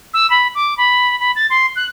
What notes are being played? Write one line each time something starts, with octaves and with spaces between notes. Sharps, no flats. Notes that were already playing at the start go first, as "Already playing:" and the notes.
E6
B5
D6
B5
B5
A6
C6
F#6